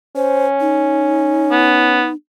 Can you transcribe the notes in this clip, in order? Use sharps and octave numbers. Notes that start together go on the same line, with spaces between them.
C#4 C5
D#4
B3